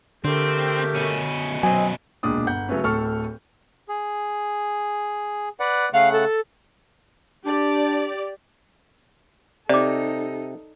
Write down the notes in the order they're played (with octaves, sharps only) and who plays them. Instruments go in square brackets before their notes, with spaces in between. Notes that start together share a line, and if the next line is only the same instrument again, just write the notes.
[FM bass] D3 [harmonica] A3 G4 A#4 [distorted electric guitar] C4
[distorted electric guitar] B2 C#4
[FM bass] F#3 [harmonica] C4 D#5 [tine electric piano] G#5
[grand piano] E1 C#2 A#2 D4 D#6
G1 F#5 G6
C#3 F#3 A3 B3 C#4
D1 A2 A4 C#6 F6
[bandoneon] G#4
B4 D5 F#5
[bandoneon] C#3 A3 F#5 [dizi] F5
[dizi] A4
[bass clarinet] D4 [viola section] G4 D5
[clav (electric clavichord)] C3 [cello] D#4 A4 [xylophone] D5 D6